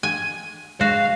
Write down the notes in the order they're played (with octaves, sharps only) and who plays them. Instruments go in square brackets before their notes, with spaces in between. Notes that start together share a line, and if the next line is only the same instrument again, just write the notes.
[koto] G#5
[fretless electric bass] G#3 [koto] F#4 [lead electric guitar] F5